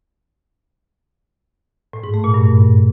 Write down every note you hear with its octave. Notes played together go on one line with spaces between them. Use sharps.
A2
G#2
A3
A#2
G2